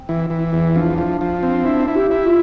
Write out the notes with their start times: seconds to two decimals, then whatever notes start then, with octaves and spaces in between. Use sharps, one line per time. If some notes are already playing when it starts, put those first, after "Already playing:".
Already playing: C4
0.09 E3
0.30 E3
0.53 E2
0.76 F3 D4
0.98 F3
1.21 F3
1.43 C4
1.65 D4 E4
1.88 E4
1.95 G4
2.11 E4
2.25 F4